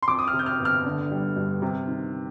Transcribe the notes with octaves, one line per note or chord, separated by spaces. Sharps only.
C6
F2 D6
D#6
F6
C3
G6
F6
G1
F6
D3
G3
G2
C3
D#3